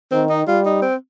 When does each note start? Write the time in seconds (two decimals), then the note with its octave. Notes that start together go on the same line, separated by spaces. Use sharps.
0.12 D#3 C4
0.30 D#4
0.47 G3 F4
0.66 D#4
0.82 C4